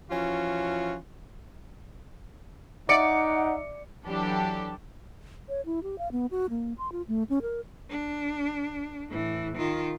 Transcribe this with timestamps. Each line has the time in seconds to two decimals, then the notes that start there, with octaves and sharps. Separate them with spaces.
0.11 E3 F3 C#4 F4 F#4
2.89 D#4 D5 E5 F#5 C#7
4.05 E3 F#3 D4 G4 A4
5.49 C#5
5.66 E4
5.83 G4
5.98 F5
6.12 B3
6.31 F#4
6.50 A#3
6.78 C6
6.92 F4
7.08 A3
7.30 C#4
7.42 A#4
7.90 D4
9.09 A2 E3
9.56 D#3 F4